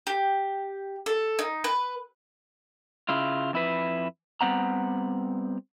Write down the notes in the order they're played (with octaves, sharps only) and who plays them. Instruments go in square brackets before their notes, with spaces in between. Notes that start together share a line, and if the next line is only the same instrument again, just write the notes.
[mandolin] G4
A4
D#4
B4
[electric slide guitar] C#3 E4 F4
F2 E4 B4
G3 B3 C4 F#5 A#5